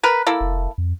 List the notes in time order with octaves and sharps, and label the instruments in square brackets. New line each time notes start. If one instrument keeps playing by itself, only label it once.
[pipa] A#4 B4
A#3 E4 A4
[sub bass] F1
F2